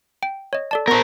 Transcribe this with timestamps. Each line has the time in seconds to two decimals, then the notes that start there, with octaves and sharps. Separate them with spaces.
0.23 G5
0.53 C#5 D#5
0.71 A4 D5 A5
0.88 B3 A#4 C5 C#6